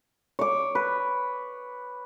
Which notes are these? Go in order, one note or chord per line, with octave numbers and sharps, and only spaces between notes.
C#5 D6
B4